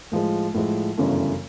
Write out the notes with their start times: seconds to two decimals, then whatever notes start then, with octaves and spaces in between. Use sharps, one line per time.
0.12 A2 F3 G#3
0.54 A2 F3 G#3
0.97 G1 F#2 C#3 E3 A3